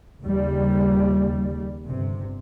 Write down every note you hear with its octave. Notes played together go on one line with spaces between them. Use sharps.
D#2 C#3 G3
G1 C3